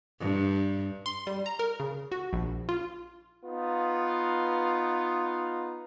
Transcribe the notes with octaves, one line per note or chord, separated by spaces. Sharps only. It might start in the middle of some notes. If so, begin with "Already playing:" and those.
G2
C6
G3
A#5
A#4
C#3
F#4
A#1
F4
B3 D#4 F4